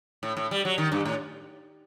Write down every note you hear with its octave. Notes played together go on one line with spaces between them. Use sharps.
A2
A2
G3
F#3
D#3
G2
A2